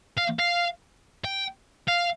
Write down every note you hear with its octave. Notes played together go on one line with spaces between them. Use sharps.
F5
F5
G5
F5